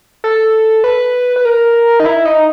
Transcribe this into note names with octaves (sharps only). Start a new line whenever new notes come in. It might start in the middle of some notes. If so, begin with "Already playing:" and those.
A4
B4
B4
A#4
D#4
E4
D#4